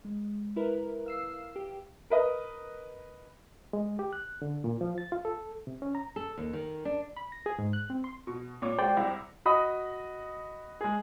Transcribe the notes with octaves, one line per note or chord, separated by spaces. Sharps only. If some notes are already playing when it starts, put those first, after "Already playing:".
G#3
E4 A#4 B4
F5 E6 C7
G4
A#4 B4 D#5
G#3
G4
F#6
D3
A#2
F3
A6
F4
A4
C3
C#4
A#5
A4
D#2
D#3
D4
B5
A#6
G#4
G#2
F#6
C4
C6
B2 C#6
A#2 C#5 D6
G#3 F#4 C5 D5 G5
C2 E4
F#4 D#5 B5 D#6
G#3 G#4